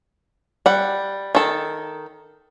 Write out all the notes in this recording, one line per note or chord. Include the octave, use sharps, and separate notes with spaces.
G3 F#5
D#3 A4